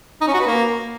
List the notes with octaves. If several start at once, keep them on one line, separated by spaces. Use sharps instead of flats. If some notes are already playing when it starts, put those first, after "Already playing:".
D#4
C#4
F#4
B4
A#3